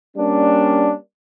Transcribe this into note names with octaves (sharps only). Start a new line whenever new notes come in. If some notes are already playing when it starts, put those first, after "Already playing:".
G3 A#3 C#4 D4